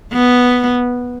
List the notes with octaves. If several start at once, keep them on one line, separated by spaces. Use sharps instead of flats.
B3